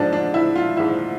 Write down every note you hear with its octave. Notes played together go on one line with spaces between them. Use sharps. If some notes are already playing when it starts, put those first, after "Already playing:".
Already playing: G#2 F3 D4
D4
E4
F4
G#2 F3 E4